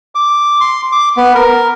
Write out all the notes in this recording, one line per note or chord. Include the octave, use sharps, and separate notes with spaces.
D6
C6
D6
B3
A#4